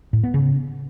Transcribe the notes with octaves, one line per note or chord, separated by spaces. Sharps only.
A2
B3
C#3